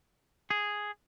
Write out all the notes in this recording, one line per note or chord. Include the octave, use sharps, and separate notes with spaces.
G#4